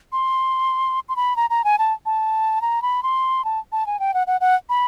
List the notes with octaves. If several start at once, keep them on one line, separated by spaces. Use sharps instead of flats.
C6
C6
B5
A#5
A#5
G#5
A5
A5
A#5
B5
C6
A5
A5
G#5
G5
F#5
F#5
F#5
B5